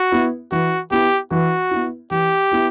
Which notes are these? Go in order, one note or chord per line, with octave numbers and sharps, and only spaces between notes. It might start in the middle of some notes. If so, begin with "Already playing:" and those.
Already playing: F#4
B3 E4
E3 F#4
B3 E4 G4
E3 F#4
B3 E4
E3 G4
B3 E4